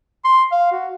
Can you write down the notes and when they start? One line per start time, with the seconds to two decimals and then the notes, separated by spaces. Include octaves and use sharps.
0.25 C6
0.52 F5
0.72 F#4